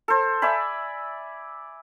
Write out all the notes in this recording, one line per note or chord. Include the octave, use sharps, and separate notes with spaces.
A4 C5
D5 E5 G#5 B5